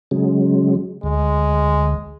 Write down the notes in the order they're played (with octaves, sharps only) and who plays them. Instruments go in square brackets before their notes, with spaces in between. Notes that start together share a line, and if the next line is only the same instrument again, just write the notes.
[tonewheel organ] C#3 F#3 G#3
[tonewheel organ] D2 [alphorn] G#3